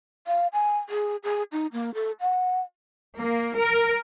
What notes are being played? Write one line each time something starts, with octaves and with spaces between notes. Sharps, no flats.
F5
G#5
G#4
G#4
D#4
A#3
A4
F#5
A#3
A#4